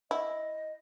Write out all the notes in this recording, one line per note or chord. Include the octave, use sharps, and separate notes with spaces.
E4 D#5